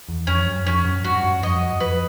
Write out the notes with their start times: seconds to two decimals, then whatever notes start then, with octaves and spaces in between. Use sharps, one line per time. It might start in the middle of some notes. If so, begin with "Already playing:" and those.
0.08 E2
0.27 F2 C#4
0.47 F#2
0.66 F2 C#4
0.85 F#2
1.04 G2 F#4
1.16 G2
1.23 F#2
1.43 F2 D#5
1.73 F#2
1.80 F2 B4